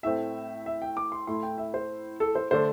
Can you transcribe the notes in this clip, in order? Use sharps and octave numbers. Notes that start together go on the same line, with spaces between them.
A2 A3 C4 E5
E5
G5
D6
C6
A2 A3 E4 C6
G5
E5
C5
A4
C5
D3 A3 D4 C5